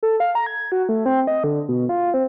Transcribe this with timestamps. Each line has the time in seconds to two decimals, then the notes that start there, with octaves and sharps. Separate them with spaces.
0.03 A4
0.20 F5
0.35 A#5
0.46 G#6
0.72 F#4
0.89 A3
1.06 C4
1.27 D#5
1.44 D3
1.69 B2
1.89 F4
2.14 C4